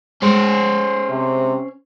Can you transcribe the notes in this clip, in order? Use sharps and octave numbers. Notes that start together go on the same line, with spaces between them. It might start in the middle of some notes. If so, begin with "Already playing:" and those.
G#3 A3 C#4 C5
C3